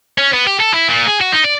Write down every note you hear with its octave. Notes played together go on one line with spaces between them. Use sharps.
C#4
B3
G4
A4
E4
A#2
G#4
F#4
D#4
D5